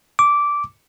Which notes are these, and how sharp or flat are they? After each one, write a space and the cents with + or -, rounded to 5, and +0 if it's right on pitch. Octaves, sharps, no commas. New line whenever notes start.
D6 -10